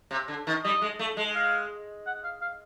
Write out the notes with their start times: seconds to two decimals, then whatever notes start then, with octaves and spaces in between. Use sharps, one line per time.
0.11 C3
0.28 D3
0.47 D#3
0.64 G3 D#5
0.82 G#3
0.99 A3
1.17 G#3
1.35 F5
2.06 F#5
2.24 F5
2.41 F5